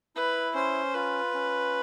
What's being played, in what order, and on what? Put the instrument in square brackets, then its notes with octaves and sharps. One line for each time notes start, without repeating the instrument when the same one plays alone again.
[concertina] E4 [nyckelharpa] B4
[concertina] C#4 [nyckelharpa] C5
[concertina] F4 [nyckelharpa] B4
[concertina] C#4